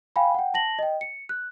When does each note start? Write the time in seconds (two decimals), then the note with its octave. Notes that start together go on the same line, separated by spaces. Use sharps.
0.16 F5 G5 G#5 B5
0.34 F#5 G5
0.54 A5 A#6 F#7
0.79 D#5 G5
1.01 C#7
1.29 F#6